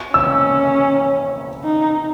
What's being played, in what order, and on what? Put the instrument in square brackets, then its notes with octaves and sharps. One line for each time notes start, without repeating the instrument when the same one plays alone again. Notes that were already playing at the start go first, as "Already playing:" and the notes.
[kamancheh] C#4 [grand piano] E6
[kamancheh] D#4